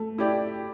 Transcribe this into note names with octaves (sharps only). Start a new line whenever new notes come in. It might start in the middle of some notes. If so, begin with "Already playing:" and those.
Already playing: A3
E4 G4 D5